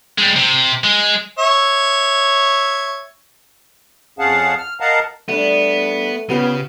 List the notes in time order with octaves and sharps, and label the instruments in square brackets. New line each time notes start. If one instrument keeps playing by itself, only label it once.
[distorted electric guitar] G3 G#3
C3
G#3
[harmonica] C#5 E5
[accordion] F2 C#4 G#4 F5 F#5 A5
F6
A#4 D#5 F5 F#5 A5 A#5
[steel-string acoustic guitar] G3 D4 [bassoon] A3 [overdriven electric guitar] B3
[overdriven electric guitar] C#3 [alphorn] B3 [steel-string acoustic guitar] C#4 F4 G4